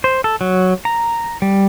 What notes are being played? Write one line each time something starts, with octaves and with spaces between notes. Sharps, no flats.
C5
A4
F#3
A#5
G3